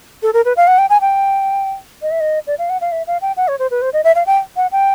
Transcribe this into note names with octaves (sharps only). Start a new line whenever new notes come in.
A4
A#4
B4
F5
F#5
G5
G#5
G5
D#5
E5
D#5
D5
F5
F#5
F5
E5
F5
G5
F#5
C#5
C5
B4
C5
D#5
E5
F5
G5
F#5
G5